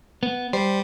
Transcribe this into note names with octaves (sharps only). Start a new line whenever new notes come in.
B3
G3 C5